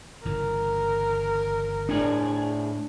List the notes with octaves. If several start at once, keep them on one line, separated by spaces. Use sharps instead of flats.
G1 C#3 E3 A#4
A2 D4 G#4